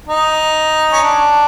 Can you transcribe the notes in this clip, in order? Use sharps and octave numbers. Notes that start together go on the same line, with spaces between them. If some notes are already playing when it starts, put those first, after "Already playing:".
D#4
C#4
D4